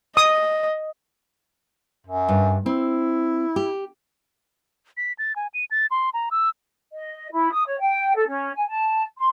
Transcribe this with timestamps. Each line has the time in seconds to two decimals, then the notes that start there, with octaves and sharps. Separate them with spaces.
0.17 D#5 D#6
2.07 F#2
2.29 G2
2.66 C4 E4
3.56 G4
4.97 B6
5.19 A6
5.36 G#5
5.54 D#7
5.71 A6
5.91 C6
6.14 A#5
6.31 E6
6.93 D#5
7.32 E4
7.51 D#6
7.66 C#5
7.80 G5
8.15 A4
8.28 C#4
8.56 G#5
8.68 A5
9.17 C6